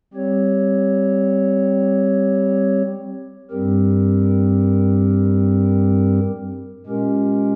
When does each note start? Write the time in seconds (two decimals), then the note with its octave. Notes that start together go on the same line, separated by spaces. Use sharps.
0.14 G3 C4 G4 C#5
3.51 G2 G3 C4 G4 A#4
6.86 A#2 G#3 C#4 G4 A#4